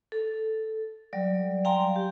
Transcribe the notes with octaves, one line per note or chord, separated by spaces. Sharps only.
A4
F#3 G3 D5
F5 G5 G#5 A#5 C6
G4